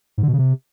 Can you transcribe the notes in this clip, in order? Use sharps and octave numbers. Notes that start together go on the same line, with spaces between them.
G#2
D3
B2
C#3
C3